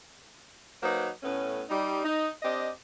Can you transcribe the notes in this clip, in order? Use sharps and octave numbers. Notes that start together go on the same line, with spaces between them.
F#3 A#3 D#4 B4 C5
A2 A3 B3 C#4
G3 D#4
D#4
C4 D4 G4 D#5